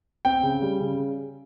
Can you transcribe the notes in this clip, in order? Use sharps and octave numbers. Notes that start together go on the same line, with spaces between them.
C4 G5
C#3
G3
C#3